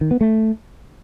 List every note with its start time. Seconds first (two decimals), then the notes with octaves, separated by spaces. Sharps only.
0.01 D#3
0.11 B3
0.21 A3